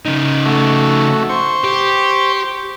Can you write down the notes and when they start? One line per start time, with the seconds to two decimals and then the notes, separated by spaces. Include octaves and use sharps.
0.06 C#3 D#4
0.45 A3 F#4
1.29 C5 C#6
1.64 G4